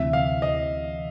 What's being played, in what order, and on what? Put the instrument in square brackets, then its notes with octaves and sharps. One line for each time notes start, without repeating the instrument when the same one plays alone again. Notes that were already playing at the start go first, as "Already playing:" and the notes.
Already playing: [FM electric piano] D2 C3 E3 [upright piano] E5
[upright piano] F5
D#5